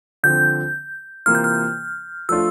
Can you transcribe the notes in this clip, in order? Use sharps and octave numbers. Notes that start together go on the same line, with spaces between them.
D3 F3 C4 G6
C3 E3 A#3 F4 F6
G6
F6
F3 A3 D4 F4 E6